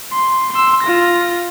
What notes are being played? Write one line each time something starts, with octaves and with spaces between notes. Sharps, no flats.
C6
C6 E6
F4 A#6